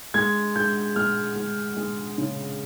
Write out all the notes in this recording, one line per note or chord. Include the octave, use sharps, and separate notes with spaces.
G#3 G#6
G#3 G6
G#3 F6
G#3
G#3
C#3